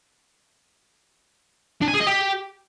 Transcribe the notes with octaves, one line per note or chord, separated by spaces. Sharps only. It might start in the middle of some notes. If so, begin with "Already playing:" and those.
D4
G#5
G#4
D#5
G4